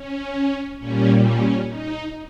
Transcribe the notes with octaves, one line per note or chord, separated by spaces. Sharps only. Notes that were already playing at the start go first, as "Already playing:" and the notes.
Already playing: C#4
A#2 G3 C#4
C#4
D#4